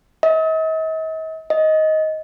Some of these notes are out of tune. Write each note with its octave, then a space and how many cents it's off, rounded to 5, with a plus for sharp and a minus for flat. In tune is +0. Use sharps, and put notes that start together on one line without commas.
D#5 +45
D#5 +10